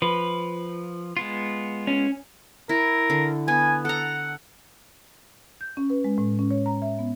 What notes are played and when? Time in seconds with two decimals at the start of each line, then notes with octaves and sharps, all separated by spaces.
0.02 F3 B4
1.17 G#3 B3 F4
1.87 C#4
2.69 E4 A#4
3.10 D3
3.48 B3 G#5
3.85 A4 F#5 A#5
5.61 G6
5.77 C#4
5.90 B4
6.04 G#3
6.18 A2
6.39 C#4
6.51 C#5
6.66 A#5
6.82 E5
6.99 B3